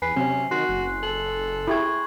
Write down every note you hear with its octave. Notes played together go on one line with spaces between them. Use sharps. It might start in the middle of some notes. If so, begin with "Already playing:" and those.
E2 B4 G#5 C7
C3 F#3 C4 C#4
D#3 F#4 C6 C7
F#1 F#6
A4 F#7
E4 G4 G#4 B5 C#6 G#6